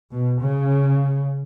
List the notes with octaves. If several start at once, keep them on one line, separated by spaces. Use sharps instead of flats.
B2
C#3